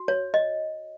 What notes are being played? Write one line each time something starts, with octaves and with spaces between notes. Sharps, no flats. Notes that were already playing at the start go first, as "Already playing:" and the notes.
Already playing: F#4
C#5
D#5